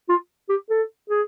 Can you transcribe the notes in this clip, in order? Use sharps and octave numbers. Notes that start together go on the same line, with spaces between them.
F4
G4
A4
G#4